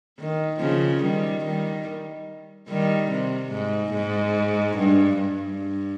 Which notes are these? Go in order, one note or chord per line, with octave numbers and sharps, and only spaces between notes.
D#3
C#3 F3
D#3 G3
D#3 G3
D#3 G3
C3
G#2
G#2
G2
G2